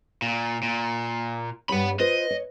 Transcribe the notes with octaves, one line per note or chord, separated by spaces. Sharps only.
A#2
A#2
G2 G4 C#5 F#5 B5
F4 B4 C5 D#5
C#5